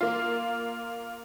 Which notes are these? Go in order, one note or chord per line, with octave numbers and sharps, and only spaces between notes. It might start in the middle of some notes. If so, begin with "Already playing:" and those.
A#3 F4